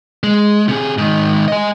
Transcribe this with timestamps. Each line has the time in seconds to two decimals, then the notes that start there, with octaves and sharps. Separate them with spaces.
0.23 G#3
0.68 C3 G#4
0.98 G#2 D#3
1.48 D#5 G#5